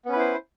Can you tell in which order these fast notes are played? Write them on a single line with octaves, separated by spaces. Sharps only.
B3 C#4 B4 E4 C5